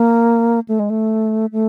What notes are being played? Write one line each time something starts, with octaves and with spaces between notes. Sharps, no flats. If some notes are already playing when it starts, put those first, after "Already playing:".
Already playing: A#3
A3
G#3
A3
A3